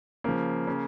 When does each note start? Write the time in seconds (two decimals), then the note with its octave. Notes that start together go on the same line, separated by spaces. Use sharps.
0.24 C#3 F3 A#3
0.67 C#3